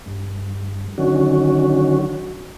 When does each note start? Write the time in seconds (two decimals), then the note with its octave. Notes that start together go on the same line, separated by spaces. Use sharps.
0.06 G2
0.98 D3 D#3 F#3 C#4 F#4